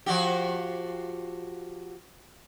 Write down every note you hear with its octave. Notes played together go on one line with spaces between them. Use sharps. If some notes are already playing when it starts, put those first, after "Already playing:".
F3 F#4 G4